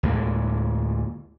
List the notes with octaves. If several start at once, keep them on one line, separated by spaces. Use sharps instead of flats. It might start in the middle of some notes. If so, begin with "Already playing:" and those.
D2 A2 G#3 A#3